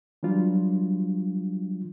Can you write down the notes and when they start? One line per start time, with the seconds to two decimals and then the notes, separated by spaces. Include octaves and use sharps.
0.23 E3 F#3 G3 D4 F4